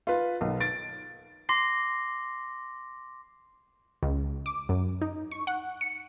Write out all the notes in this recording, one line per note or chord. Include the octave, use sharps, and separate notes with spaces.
F4 B4
B1
A6 D7
C6 D6 A#6 C7
C#2
D6
F#2
D#4
C#6
F#5
C#7